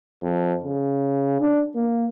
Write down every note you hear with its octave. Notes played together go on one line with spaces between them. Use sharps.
F2
C#3
D4
A#3